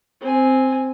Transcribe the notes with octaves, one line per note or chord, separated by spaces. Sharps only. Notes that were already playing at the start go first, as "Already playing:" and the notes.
C4 G#5